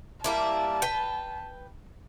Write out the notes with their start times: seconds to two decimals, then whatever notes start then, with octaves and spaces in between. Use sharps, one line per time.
0.24 G3 A#3 E4 A5
0.82 B4 G5